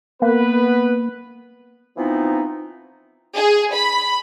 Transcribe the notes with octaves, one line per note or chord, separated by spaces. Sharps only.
A#3 B3 B4
E3 F3 B3 C4 D#4
G#4
B5